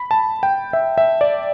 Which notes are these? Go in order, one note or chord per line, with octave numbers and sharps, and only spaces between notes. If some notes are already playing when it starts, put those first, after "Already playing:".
Already playing: B5
A5
G5
E5
E5
D5